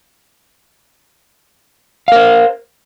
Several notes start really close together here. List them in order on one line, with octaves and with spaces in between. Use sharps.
F5 A#4 C5